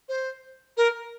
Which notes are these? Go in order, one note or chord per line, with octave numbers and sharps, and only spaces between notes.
C5
A#4